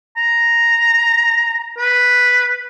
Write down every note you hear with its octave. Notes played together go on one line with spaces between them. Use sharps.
A#5
B4